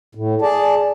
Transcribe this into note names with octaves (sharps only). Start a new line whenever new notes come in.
A2
G#4 D5 A5